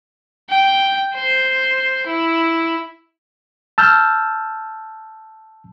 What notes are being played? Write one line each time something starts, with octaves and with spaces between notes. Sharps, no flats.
G5
C5
E4
A5 E6 F6 G6